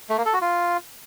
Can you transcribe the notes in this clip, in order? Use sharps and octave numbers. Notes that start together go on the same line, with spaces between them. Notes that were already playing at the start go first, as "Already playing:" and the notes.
A3
A#3
A4
F#4
F4